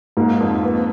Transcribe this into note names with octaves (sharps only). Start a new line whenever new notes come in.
G#2 A#3
F2
B3